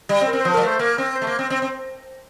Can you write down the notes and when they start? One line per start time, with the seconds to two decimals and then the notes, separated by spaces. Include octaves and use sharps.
0.09 G3 G4
0.21 C4
0.27 A#4
0.33 C4
0.41 F3 C5
0.54 G3 A#4
0.62 A3
0.67 C5
0.79 A#3 A#4
0.98 C4
1.15 C5
1.22 A3
1.27 A#3
1.39 C4
1.50 C4
1.62 C4